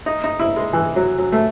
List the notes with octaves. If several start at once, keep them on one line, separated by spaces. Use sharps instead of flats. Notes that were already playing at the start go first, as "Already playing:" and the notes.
D#4
D#4
E4
G#3
E3
F#3
F#3
A3